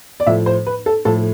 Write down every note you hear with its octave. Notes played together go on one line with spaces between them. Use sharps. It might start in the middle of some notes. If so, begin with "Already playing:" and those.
D5
A2 F3 A3 E5
C5
B4
A4
A2 F3 A3 A4